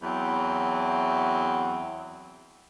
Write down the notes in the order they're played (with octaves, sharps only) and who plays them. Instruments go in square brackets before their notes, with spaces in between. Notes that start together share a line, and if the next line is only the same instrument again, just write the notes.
[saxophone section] E2 F#3 C4 E5 F#5